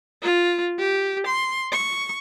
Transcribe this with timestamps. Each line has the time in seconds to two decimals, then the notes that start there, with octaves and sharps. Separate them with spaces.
0.22 F4
0.79 G4
1.26 C6
1.72 C#6